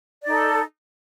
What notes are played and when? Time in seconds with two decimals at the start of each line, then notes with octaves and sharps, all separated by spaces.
0.23 D5
0.26 D#4
0.29 A4